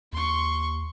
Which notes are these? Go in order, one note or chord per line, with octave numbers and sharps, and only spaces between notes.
D#2 C6 C#6